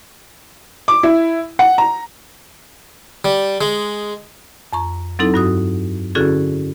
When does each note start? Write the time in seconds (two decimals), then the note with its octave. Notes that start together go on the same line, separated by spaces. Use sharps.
0.88 D6
1.03 E4
1.59 F#5
1.78 A#5
3.25 G3
3.61 G#3
4.73 F2 A#5 C#6
5.19 F#3 C4 D#4 E4 A4
5.34 G2 F#4 D#6
6.15 D3 C#4 E4 F#4 G#4 A4